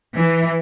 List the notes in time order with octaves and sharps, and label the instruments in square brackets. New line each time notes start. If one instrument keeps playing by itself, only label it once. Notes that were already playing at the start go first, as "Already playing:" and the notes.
[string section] E3